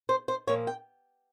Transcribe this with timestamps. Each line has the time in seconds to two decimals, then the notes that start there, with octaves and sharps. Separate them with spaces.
0.09 C5
0.28 C5
0.47 A#2 F3 A#3 C#5
0.67 G5